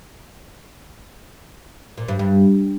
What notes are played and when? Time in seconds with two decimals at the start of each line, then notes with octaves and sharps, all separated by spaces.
1.98 A#2
2.08 G2
2.19 G2